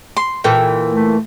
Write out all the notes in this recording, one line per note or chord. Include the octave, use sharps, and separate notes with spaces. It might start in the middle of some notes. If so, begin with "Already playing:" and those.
C6
A#2 E3 A4 G5
A3